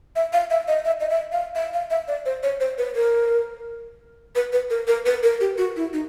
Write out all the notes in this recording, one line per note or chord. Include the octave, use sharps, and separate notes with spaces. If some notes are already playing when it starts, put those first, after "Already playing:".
E5
F5
E5
D#5
E5
D#5
E5
F5
E5
F5
E5
D5
C5
C#5
C5
B4
A#4
B4
B4
A#4
A#4
B4
A#4
G4
F#4
E4
D#4